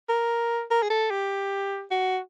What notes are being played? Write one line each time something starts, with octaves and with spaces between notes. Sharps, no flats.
A#4
A#4
G#4
A4
G4
F#4